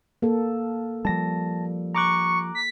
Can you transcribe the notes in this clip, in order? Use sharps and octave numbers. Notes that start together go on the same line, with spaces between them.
A#3 A4
F3 G3 A5 A#6
A#5 C#6 D6 F#6
B6